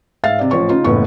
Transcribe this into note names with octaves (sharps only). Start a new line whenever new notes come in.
G#2 E5 F5 A6
C3 D5
A1 F3 C#5 C#6
C#3 D#4 F4
F#1 A2 E3 B3 C#6